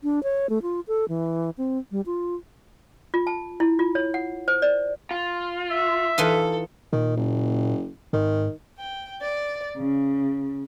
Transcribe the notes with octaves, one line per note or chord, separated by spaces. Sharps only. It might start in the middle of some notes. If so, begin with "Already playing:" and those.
D4
C#5
A3
F4
A4
E3
C4
G3
F4
F4
A5
E4
F4
C#5
F#5
C5
D5
F4
E5
E3 D#4 F4 A4
A#2 D#3
F#1
G#2 D#3
G5
D5
C#3